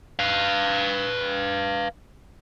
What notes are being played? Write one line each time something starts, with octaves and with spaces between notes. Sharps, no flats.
B4 F5